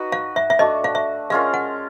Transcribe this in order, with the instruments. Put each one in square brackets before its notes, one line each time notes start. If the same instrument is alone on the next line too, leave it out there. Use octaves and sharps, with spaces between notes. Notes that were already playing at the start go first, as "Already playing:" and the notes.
Already playing: [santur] D#4 F#4 B4
[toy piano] F5
E5
E5
[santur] A3 D4 F#4 [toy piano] D#5
[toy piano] F5
E5
[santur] G#3 C#4 F4 A#4 [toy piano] F5
[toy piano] F#5